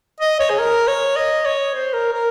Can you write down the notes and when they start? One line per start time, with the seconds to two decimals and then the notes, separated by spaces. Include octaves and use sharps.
0.20 D#5
0.40 C#5
0.50 G#4
0.59 A#4
0.88 C#5
1.16 D#5
1.45 C#5
1.74 C5
1.93 A#4
2.12 A#4